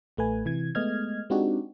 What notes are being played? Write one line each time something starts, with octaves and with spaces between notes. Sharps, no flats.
A1 A3 B4 G#5
C3 E3 G#6
G#3 A3 B3 D#5 F6 G#6
G#3 C4 D4 D#4 F#4 G4